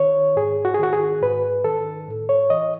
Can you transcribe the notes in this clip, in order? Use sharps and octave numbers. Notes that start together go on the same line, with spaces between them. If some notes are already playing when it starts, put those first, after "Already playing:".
Already playing: D#3 C#5
G#2 G#4
F#4
G#4
D#3 F#4
G#4
G#2 B4
D#3 A4
A2
C#5
E3 D#5